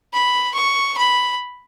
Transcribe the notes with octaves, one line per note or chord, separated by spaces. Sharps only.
B5
C#6
B5